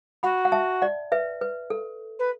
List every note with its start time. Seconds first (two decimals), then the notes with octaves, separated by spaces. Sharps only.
0.23 F#4 F#5 B5
0.45 F#5
0.52 E5 A5
0.82 D5 F#5
1.12 B4 E5
1.41 B4
1.70 A4
2.19 B4